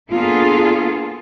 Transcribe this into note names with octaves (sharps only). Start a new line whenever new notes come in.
A#3 B3 D4 F4 G#4 A4